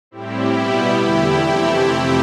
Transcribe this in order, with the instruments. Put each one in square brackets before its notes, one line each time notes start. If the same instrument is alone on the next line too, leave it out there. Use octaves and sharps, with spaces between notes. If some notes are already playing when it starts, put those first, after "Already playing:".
[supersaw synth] A2 G3 C4 E4 G4
B2 G3 B3
E2 D3 A3 E4 G4
F2 C3 E3 A3 C4
F2 C3 F3 A3